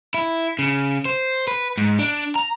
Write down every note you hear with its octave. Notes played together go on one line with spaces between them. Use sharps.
E4
C#3
C5
B4
G#2
D4
A#5